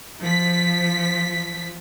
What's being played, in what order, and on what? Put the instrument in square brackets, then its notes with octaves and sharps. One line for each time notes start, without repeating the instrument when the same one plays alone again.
[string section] F3 B6